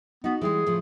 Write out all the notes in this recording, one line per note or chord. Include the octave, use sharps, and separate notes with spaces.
B3 D#4 F#4
E3 G3 G#3 G#4
A2 C#3 F3